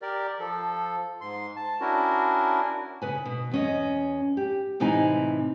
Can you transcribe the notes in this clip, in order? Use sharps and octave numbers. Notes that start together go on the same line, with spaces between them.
G4 A#4 D5
F3 A4
G#2 C6
A5
C#4 D4 E4 F#4 A#4
C#3 B4 G#5
B2
E2 C#4 D#5
G4
A2 C3 E3 D#4 G#5